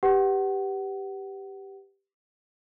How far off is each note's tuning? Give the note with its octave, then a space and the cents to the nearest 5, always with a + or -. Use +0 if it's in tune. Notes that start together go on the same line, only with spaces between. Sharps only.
G4 +0 B4 +0 F#5 +25